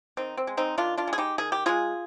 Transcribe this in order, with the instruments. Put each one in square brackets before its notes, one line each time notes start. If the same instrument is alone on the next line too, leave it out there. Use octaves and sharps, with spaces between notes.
[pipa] D#3 C4 D#4
C4
G#3
C4 D#4
D#3 D4 F4
D4 F4
G#3
G#4
D#4 G4
D#3 G#4
G4
G#3 F4 G#4